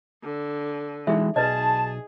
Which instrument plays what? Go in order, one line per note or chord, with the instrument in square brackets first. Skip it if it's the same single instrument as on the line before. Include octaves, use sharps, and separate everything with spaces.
[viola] D3
[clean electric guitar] E3 G#3 [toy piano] D#4 G#4 E5
[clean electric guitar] B1 [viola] G#4 [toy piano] B4 D5 D#5 [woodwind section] A5